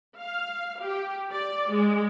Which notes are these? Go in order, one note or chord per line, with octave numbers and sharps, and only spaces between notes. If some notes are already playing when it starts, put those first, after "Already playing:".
F5
G4
D5
G#3